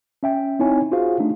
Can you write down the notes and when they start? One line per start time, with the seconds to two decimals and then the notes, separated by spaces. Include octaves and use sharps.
0.23 C#4 E5 G5
0.59 C4 D#4 E4 C#5 G#5
0.92 F4 F#4 G#4 C5 F5
1.20 A3 D4 D#4